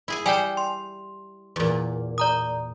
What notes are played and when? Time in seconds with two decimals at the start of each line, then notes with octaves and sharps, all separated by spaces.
0.08 E4 G#4 G#5
0.26 G3 D5 G5 G#5
0.57 C6
1.56 E2 A#2
2.18 D5 A#5 D#6